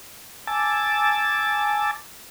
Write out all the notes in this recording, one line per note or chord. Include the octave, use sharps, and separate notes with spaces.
G#5 A5 D6 E6 A6